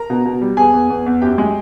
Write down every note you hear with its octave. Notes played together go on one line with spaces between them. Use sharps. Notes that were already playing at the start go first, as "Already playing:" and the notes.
Already playing: A#4 A#5
B2
B2
G3
E2 G#4 G#5
E2
E2
E2
F#2 G4 G5
G#3